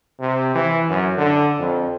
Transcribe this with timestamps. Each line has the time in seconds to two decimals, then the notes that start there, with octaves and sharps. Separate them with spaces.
0.20 C3
0.55 E3
0.89 F#2
1.18 D3
1.59 F2